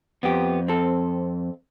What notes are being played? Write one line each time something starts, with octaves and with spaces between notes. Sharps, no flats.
F2 B3 G4
C4 A4